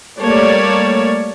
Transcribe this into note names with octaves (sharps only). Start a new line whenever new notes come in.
G3 A3 A#3 C#5 D5 A5